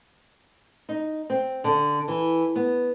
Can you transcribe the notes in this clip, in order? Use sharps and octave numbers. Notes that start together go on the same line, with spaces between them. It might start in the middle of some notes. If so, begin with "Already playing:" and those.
D#4
C4
D3
E3
B3